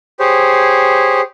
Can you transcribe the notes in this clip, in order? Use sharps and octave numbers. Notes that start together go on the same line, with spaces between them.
G4 G#4 C5 C#5